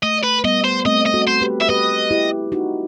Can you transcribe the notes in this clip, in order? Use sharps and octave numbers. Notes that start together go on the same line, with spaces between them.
A3 D#5
B4
G3 B3 D#5
C5
A3 C4 D#5
D#5
F#4 A4
C5
G4 B4
E5
G4 B4 D#5
E4 G4
D#4 F#4